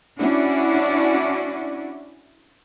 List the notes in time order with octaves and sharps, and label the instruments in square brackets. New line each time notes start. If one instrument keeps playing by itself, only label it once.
[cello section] C#4 D4 E4 F#4 D5